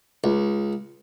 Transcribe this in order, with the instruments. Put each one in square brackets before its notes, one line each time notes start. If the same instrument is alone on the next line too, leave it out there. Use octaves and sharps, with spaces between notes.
[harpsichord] C#2